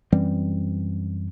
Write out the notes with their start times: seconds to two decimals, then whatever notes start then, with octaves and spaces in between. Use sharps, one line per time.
0.12 F#2 E3 G3 C4